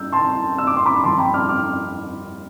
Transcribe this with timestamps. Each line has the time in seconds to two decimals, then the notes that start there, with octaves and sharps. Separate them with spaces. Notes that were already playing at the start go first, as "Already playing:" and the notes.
Already playing: G2 E6 G6
0.12 A5 C6
0.58 E6
0.67 D6
0.77 C6
0.86 B5 D6
1.04 G2 F3 A5 C6
1.19 G5 B5
1.34 D6 F6
1.49 D6 F6